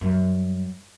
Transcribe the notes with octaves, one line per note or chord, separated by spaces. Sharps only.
F#2 G3